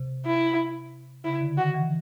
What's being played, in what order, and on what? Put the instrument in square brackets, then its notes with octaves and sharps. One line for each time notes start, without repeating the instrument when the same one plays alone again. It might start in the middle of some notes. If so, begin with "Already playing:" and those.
Already playing: [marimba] C3
[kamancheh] E4
[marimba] C#3 [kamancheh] E4
[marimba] D3
[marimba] D#3 [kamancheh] F#4
[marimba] E3